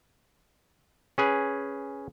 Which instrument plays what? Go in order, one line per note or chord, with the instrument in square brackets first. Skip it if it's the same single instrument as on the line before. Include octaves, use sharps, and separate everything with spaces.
[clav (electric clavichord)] C#4 G#4 B4